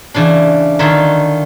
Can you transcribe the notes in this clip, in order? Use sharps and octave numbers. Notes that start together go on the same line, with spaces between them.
C#3 E3 D4
D3 D#3 D#4 F4 C#5 E5